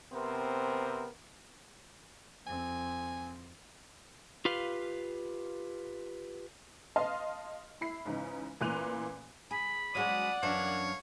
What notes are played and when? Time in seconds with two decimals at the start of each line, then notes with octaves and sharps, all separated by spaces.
0.12 C3 B3 C4 A#4 C5
2.47 F2 C4 G#5
4.45 F4 G4 B4 F5
6.96 D#5 F5 A5 C6 F6
7.81 E4 B5 C7
8.05 G#2 C#3 E3 D#4
8.61 A1 A#2 E3 F#6 D#7 F7
9.51 G#4 B5
9.95 F#3 G#3 C#4 D5 F#5 D#6
10.43 F#2 E3 D4 C#5 F5